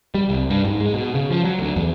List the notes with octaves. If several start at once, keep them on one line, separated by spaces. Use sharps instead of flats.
G3
C2
G2
G#2
G#3
B2
C#3
F3
F#3
D2
E2